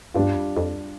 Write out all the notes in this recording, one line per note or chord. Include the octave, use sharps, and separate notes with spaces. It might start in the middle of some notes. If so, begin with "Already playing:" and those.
G2 G3 D4 F4
F2
F2